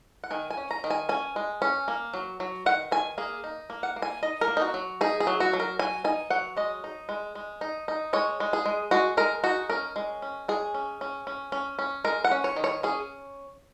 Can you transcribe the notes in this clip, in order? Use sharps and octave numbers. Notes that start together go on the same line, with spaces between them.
F#5
D#3 G#5
G#5
C#4
A#5
D#3
G#5
C#4 G#5
G#3
C#4
A#3
F#3
F#3
D#3 F#5
D#3 G#5
A#3 G#4
D#4
A#3
F#5
A#3
G#5
D#4 D#5
A#4
A#3
D#4
F#4
F#3
D#4 G#4
G#4
F#3
F#4
F#3
A#4
F#3 G#5
D#4 G#5
F#3 F#5
G#3 D#5
D#4
G#3
G#3
D#4
D#4
G#3 C#5
G#3
G#4
G#3
G#3 F#4
G#3 A#4
D#4 F#4
C#4 A#4
G#3
C#4
G#3 G#4
C#4
C#4
C#4
C#4
C#4
G#3 A#4
F#5
C#4
C#5
D#3
C#5
C#4 G#4